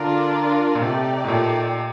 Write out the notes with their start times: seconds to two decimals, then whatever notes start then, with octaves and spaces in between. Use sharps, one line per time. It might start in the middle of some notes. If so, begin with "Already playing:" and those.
Already playing: D3 D4 F4 A#4 D5
0.75 A#2
0.81 C3 A3 D#4 G4 D5
1.24 A2
1.28 A#2